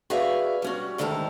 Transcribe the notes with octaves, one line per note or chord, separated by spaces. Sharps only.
F#4 G#4 B4 D5 E5 F5
G3 C#4 F#4
D2 G#2 D#3 E4 A4 A#5